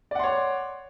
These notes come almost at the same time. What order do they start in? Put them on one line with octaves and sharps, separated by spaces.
D5 F#5 C6 C#5